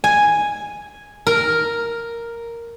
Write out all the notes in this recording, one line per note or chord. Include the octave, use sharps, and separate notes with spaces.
G#5
A#4